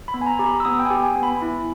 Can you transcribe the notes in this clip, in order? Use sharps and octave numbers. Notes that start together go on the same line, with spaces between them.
B5
B3
G#5
A#5
G4 A#5
B5
E6
B3 D#6
G5
G#5
G4
G#5
B3
B5
E4